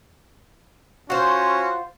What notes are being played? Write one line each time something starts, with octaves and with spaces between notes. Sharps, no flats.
C#4 F4 F#4 C5